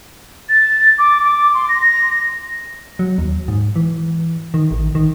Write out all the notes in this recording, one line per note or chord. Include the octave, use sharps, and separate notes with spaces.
A6
D6
D6
C6
A#6
A#6
F#3
D#2
G#2
E3
D#3
A1
D#3